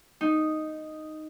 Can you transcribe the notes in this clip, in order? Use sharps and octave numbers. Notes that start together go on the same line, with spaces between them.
D#4